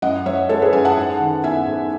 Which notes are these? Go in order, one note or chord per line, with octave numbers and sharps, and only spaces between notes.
F#2 D#5 F#5
F#2 C#5 E5
G#3 A4 C#5
G#4 B4
F#2 E5 G#5
F#5 A5
G#2
D#3
B3 E5 G#5
G#2